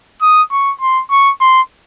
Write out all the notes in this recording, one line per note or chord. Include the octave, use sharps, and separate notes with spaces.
D#6
C#6
C6
C#6
C6